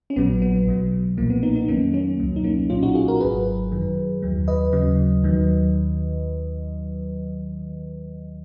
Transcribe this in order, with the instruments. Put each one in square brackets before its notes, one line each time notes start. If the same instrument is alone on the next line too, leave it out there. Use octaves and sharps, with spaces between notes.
[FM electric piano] C#4
A#1 A#2 F#3 B3
B3
B1 B2 F#3
B1 A#2 F3 A#3
B3
B3 D#4
B3 D#4
F2 D#3 F#3 A#3 C#4
A#3 C#4
C#2 B2 F#3
D#4
A#3 C#4
B1 A#2 F#3 C#4 F4
D#4 F#4
F4 G#4
F#4 A#4
G#1 G#2 F#3 G#4 B4
F#2 D#3 F#3
D#2 D#3 F#3
B4 D#5
D#2 C#3 F#3
D#2 D#3 F#3